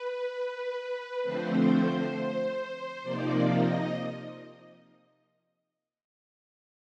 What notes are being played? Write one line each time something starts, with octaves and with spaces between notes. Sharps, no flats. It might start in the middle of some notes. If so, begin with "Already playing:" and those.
Already playing: B4
D3 F3 A3 C4 C5
C3 F3 A#3 D#4 D5
D#5